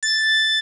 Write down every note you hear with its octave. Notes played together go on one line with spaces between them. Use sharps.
A6